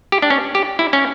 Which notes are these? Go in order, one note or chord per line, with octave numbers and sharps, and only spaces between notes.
G4
D4
C#4
G4
E4
C#4